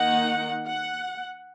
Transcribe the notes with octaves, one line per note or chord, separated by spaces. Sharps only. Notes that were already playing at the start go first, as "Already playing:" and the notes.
Already playing: D#3 A#3 D#4 F#5
F#5